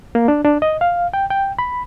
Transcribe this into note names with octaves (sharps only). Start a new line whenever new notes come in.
A#3
D4
D4
D#5
F5
G5
G5
B5